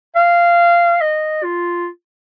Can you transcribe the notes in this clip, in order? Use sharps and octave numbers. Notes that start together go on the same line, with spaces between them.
F5
D#5
F4